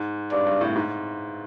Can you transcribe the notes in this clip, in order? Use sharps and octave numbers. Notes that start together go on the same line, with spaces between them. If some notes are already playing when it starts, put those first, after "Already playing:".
Already playing: G#2
G2 D5
G2
A2
G#2